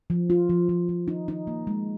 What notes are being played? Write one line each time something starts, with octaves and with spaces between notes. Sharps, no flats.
F3
F4
F3
F3
F3
D#4
D#4
A#3
G#3